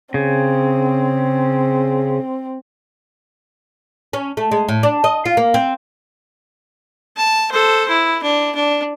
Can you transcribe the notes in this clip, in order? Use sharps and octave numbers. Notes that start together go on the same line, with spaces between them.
C#3 C4
C#4
A3
G#3
A2
D4
D#5
F4
A#3
C4
A5
A4 C5
E4
D4
D4